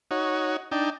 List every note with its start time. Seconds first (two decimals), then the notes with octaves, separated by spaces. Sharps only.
0.11 D#4 F#4 C#5
0.72 D4 D#4 G5